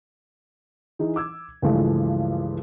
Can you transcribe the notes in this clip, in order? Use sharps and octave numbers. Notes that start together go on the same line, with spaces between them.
E3 D#4 G#4
D6 E6 G#6
C#2 G2 E3 F3 G#3 A3